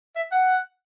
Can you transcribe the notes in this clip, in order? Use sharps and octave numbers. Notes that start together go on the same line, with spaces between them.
E5
F#5